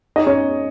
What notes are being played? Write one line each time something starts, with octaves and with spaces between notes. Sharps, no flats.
D#4 D#5
C#4 C#5